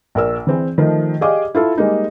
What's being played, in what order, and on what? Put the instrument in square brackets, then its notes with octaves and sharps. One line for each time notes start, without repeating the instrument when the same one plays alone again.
[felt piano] A#1 A#4 E6
E3 C4 G#4
D#3 F3 A3 D#4
G4 G#4 D5 D#5 F5 D6
E4 F4 A4
G3 G#3 A#3 D#4